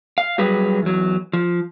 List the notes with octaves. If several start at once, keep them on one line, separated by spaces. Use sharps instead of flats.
F5
F#3 G3 G#4 B4
E2 F#3
F3